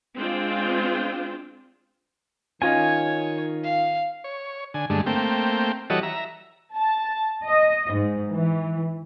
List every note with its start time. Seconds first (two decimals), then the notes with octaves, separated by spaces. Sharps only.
0.16 G#3 C4 D4 F4 C5 G5
2.62 D#3 C#4 F4 C#5 D#5 G#5
3.64 F5
4.24 C#5
4.74 D3 G#5
4.90 G2 D3 G#3 A3
5.06 A3 A#3 C4 G5
5.90 E3 G3 F#4 A4 C#5 D#5
6.03 E5 A#5
6.75 A5
7.43 D#5
7.91 G#2
8.30 E3